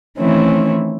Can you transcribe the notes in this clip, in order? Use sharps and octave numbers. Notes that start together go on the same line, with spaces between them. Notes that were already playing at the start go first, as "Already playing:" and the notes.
D#3 E3 A3 C4 C#4 E4